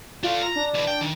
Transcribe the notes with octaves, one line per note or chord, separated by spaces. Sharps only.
A3 D4 F4
A#5
D4
B1 E3
G5
D#3